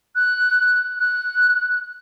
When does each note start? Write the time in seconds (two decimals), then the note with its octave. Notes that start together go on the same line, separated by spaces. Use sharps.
0.16 F#6
0.99 F#6